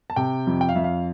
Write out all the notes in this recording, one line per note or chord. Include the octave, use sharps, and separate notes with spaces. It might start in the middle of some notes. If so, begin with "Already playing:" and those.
A5
C3 G5
F2
G5
F5
F2 E5
F5